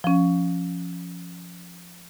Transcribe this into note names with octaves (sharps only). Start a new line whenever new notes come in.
F3 C#4